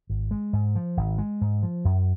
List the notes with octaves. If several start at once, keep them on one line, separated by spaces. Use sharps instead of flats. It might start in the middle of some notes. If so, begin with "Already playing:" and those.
G#1
G#3
G#2
F3
G#1
G#3
G#2
F3
F#2